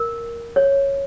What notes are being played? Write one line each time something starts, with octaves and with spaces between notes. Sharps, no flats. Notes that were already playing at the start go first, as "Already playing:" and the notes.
Already playing: A#4
C#5